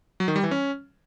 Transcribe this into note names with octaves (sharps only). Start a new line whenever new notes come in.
F#3
D#3
G3
E3
C#4